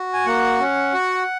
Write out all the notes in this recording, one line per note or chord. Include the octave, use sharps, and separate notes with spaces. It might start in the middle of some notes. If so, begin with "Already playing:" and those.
Already playing: F#4
G#5
A#3 F#5
C#4
F#4